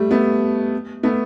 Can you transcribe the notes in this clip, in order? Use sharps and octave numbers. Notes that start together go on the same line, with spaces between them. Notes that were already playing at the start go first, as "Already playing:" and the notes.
Already playing: G3 A3
A3 B3
A3 B3